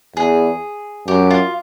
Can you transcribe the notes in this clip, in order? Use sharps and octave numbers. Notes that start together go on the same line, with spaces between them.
E2 G#4
F#2 G4
F4